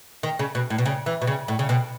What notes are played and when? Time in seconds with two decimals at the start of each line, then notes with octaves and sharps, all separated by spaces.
0.23 D#3
0.39 C#3
0.55 B2
0.70 A2
0.78 B2
0.86 C#3
1.06 E3
1.22 B2
1.27 C#3
1.48 A2
1.59 C#3
1.69 B2